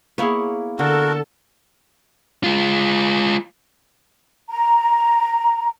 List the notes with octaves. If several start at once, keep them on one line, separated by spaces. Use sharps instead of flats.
A#3 B3 E4 G#4 C#5
D3 F#4 A4 A#4
G#3 F4
A#5